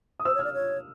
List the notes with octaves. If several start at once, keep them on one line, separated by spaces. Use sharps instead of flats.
D#6
C5 E6
C#5
D5 F6
C#5